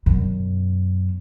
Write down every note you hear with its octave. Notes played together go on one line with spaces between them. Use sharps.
F#2 B2